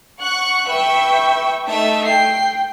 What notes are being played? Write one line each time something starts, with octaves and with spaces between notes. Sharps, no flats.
F#5 C#6 F#6
B4 E5 G5 C#6
A3 D#4 E5
G5 C7